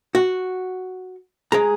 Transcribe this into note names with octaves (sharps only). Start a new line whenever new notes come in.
F#4
G#3 G#4 A#5